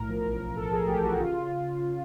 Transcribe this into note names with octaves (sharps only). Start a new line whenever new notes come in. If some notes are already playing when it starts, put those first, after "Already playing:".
Already playing: B1 A2 A#4
F3
A1
A1
A2 A4
F3 G#4
A1 G4
A1 F#4
C#3 F4